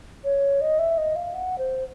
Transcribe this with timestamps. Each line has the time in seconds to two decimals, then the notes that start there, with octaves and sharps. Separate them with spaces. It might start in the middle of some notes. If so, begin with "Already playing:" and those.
0.24 C#5
0.61 D#5
0.79 E5
0.98 D#5
1.16 F5
1.34 F#5
1.58 C5